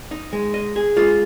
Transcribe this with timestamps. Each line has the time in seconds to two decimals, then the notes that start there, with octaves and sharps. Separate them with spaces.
0.11 D#4
0.33 G#3
0.54 D#5
0.76 G#4
0.97 G#3 F4